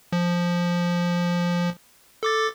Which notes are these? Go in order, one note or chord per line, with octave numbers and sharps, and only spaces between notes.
F3
A4 D6 A6